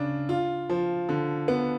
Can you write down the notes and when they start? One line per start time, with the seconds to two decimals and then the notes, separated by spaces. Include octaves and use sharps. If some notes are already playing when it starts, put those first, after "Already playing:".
Already playing: C#3 D4
0.29 F4
0.69 F3
1.09 D3
1.48 B3